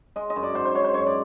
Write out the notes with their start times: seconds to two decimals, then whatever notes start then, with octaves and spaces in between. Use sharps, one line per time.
0.16 G#3 D#5
0.30 D#5
0.36 F#2
0.43 D5
0.55 G#2 C5
0.65 C5
0.75 G#2 C#5
0.84 C5
0.94 F#2 C#5
1.06 D5